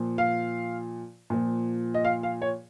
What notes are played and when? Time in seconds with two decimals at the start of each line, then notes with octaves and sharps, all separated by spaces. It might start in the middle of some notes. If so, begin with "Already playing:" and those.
Already playing: A#2 F3
0.18 F5
1.30 A#2 F3
1.94 D#5
2.05 F5
2.23 F5
2.42 C#5